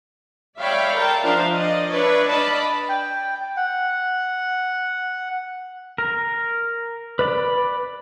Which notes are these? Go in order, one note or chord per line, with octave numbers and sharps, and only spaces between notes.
C#5 D5 E5 F5 G5 B5
A#4 G5 A5
F3 D4 A#4 C5 E5 F5
D5 D#5
D4 B4 C#5 D5 E5
D5 D#5 F5 A5 B5
G5
F#5
A#4
B4 D5 B5